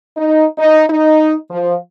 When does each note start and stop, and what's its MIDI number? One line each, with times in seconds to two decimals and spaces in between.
0.17 0.45 63
0.58 0.84 63
0.90 1.34 63
1.49 1.74 53